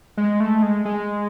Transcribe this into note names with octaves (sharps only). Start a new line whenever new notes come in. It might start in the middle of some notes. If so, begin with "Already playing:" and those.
G#3
A3
G#3
G#3